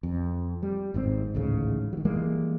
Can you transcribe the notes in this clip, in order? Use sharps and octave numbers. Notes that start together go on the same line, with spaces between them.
F2
G3
G#1 G#2 D#3 C4
A1 D2 G#2 C#3
D#3 F#3
E3 G3 G#3 A#3